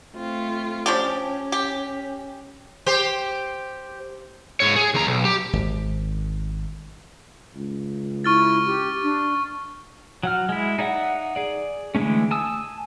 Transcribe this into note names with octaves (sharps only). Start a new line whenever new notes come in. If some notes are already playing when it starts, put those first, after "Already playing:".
A3 C4 F4
F3 C#4 D4 G4
G4
G4 C5
G#2 C#5
G#4
D#2 A#5
B1
G4
G#1
C#2
E4 C#6 F6 A6
G4
D4
F#3 F#5 F6
G#3 E4
D#4 D5 E5 F#5
G#4 D5
D3 E3 G#3 A3 C#4
G#5 A5 D#6 E6